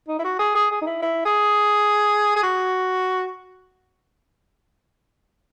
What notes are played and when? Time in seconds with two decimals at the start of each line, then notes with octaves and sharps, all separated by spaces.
0.08 D#4
0.19 E4
0.24 F#4
0.39 G#4
0.55 G#4
0.71 G#4
0.82 D#4
0.86 E4
1.02 E4
1.25 G#4
2.36 G#4
2.43 F#4